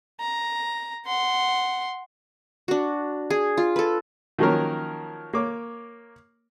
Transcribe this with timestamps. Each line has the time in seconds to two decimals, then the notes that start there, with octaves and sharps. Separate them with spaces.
0.20 A#5
1.06 F#5 C6
2.68 D4 F#4
3.30 G#4
3.57 F4
3.76 A4 B4
4.39 D#3 F3 F#3 A#3 C#4 A#4
5.33 A#3 C#5 D6